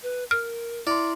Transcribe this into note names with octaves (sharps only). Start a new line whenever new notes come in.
B4
A#4 F6
E4 D5 C6